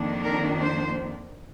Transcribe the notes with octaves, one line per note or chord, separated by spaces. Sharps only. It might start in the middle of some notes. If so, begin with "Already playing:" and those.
Already playing: F2 D#3 A#3 D4
A#4
C5